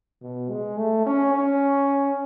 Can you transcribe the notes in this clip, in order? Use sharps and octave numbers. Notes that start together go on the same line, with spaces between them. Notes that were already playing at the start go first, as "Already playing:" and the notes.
B2
G#3
A3
C#4
C#4